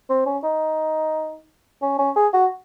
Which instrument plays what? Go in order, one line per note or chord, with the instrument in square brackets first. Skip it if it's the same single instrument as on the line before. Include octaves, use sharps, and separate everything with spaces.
[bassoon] C4
C#4
D#4
C#4
C#4
G#4
F#4